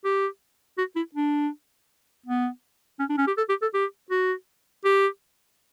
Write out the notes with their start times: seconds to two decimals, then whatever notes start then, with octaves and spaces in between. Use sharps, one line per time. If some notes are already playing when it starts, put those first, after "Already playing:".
0.04 G4
0.78 F#4
0.96 E4
1.15 D4
2.26 B3
3.00 C#4
3.09 D4
3.18 C#4
3.27 G4
3.37 A4
3.49 G4
3.62 A4
3.74 G4
4.10 F#4
4.85 G4